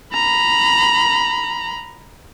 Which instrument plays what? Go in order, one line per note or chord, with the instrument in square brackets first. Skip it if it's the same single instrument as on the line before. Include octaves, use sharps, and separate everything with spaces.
[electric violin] A#5 B5